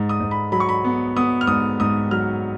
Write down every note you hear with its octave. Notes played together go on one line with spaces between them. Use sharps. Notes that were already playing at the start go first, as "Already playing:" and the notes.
Already playing: G#2
D#6
G#2
B5
F#3 B5
C#6
B5
B3
B3 D#6
F6
G#2 D#6
G#2 D#6
F#3 F6